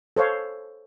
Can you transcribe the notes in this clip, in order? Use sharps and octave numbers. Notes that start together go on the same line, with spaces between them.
A4 C5 C#5 F5